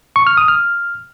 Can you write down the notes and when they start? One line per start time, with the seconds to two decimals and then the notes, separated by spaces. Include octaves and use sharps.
0.16 C#6
0.27 F6
0.37 D#6
0.48 F6